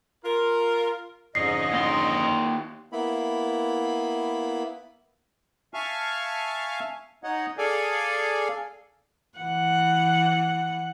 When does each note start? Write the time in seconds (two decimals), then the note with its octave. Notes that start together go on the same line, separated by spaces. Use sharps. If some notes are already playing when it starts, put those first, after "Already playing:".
0.24 F4 A#4
1.35 F2 G#2 D3 C#4 D#5 C7
1.72 D#2 C6
2.92 A#3 B3 E4 B5
5.74 E5 F5 G#5 A5 C#6 F6
7.24 D#4 C#5 D#5 F#5
7.58 G#4 A4 D5 F5 G#5
9.38 E3 F#5